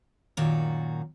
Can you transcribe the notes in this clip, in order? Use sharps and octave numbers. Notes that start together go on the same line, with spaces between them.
F#2 A#2 D#3 F#4